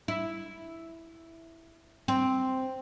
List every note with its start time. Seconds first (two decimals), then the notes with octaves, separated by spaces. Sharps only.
0.08 E4
2.08 C4